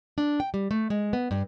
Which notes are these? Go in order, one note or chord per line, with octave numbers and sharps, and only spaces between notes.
D4
G5
G3
A3
G#3
B3
G2